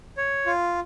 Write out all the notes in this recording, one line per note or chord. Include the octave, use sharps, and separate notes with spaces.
C#5
F4